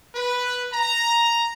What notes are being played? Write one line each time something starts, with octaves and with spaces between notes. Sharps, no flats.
B4
A#5